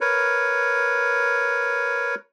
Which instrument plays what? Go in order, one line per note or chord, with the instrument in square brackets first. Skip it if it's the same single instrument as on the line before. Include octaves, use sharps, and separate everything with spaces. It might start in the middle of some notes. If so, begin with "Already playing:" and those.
[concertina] A#4 B4 C#5